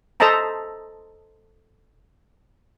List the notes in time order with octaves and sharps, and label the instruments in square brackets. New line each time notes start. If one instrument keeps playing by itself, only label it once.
[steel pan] A4 C5 D#5 E5 A5 A#5